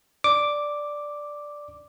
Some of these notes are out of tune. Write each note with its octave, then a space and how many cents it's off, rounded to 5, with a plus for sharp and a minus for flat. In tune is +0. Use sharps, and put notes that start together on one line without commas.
D5 +0 D6 +0